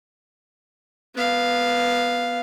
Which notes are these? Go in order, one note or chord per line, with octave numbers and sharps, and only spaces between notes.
B3 F5